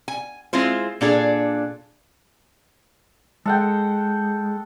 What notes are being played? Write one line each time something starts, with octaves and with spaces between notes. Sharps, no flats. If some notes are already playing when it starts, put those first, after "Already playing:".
G#5
G#3 C4 E4 F4 C5
A#2 D4 G#4 A4
G#3 A4 F#5 G5